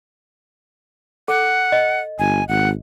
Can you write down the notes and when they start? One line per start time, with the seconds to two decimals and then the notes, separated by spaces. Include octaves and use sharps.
1.28 A4 F#5
1.72 D#5
2.19 G1 G#5
2.48 G#1 F#5